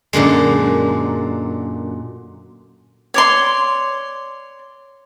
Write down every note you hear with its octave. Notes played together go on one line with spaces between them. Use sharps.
F#2 A#2 D3 G#3
C#5 D5 C6